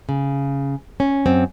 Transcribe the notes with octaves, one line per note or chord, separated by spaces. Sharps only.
C#3
C#4
F#2 C4